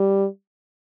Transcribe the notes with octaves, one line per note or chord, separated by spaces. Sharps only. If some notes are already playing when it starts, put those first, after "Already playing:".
Already playing: G3